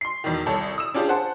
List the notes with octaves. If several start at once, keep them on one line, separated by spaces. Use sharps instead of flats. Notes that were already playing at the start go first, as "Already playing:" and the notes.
C6 C7
E2 B2 D#3
C2 A4 C#5
D#6 E6 E7
C#4 D4 F4 G4 G#4
C5 F#5 A5